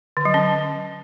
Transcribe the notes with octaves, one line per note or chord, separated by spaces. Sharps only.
D3
F#3
C#4